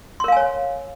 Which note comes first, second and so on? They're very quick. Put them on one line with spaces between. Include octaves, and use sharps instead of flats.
C6 A#4 F5 G#5 C#5